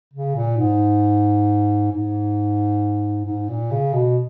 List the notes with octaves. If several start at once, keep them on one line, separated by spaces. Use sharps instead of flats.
C#3
A#2
G#2
G#2
G#2
A#2
C#3
B2